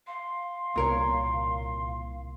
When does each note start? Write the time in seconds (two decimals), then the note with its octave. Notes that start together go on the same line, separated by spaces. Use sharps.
0.07 F5 C6
0.76 C2 A#2 A#4 C#5